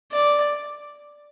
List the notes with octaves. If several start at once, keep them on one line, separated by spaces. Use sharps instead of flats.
D5